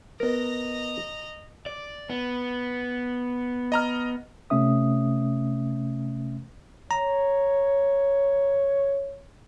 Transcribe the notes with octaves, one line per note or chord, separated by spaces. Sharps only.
B3 A#4 D#5 A#5
D5
B3
D#5 A#5 F6
C3 A3 C#4 E5 D#6
C#5 A#5